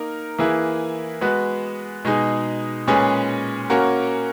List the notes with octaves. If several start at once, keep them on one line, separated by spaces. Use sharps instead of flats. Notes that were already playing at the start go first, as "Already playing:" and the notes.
Already playing: A#3 D#4 A#4
E3 A#3 E4 G#4 B4
G#3 B3 F#4 B4
B2 G#3 D#4 G#4
A#2 G#3 C#4 G#4 B4
A#3 C#4 F#4 A#4